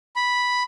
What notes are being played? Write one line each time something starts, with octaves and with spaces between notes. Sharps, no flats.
B5